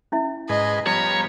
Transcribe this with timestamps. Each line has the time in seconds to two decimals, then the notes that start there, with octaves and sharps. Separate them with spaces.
0.12 C#4 E4 E5
0.49 G#2 G#4 B4 D#5
0.87 F3 G3 B3 C#5 A#5